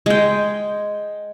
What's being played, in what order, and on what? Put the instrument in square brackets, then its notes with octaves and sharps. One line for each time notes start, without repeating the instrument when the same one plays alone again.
[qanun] G#3 G5